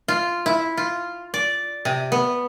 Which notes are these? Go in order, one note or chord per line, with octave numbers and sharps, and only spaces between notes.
F4
E4
F4
D5
C3
B3